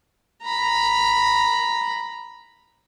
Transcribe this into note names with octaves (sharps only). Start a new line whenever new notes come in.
A#5 B5